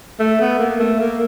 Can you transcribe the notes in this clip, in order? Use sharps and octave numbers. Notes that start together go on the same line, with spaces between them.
A3
B3
A#3
A3
A#3